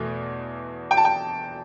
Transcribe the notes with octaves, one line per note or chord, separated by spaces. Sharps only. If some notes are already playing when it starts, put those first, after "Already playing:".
Already playing: E2 B2 A3
G5
A5
G5